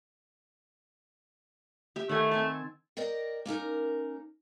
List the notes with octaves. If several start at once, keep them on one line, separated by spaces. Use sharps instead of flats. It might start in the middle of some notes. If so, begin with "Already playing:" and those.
G4 E5
D#3 A3 F#5 G#5
C4 G#5 A5
A#4 D5 D#5 G5
A#3 C#4 D#4 A#4